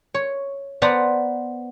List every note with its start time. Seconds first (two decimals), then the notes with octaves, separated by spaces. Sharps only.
0.15 C#5
0.82 B3 C5 D5 F#5 A5 A#5